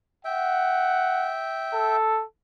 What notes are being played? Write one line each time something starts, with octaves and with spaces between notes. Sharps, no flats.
E5 F#5 G5
A4